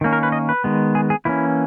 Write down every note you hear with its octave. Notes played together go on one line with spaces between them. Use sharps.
D#3 A#3 C#4
A#4
B4
D#5
B4
D#3 G#3 B3
G#4
G#4
E3 A#3 C#4 E4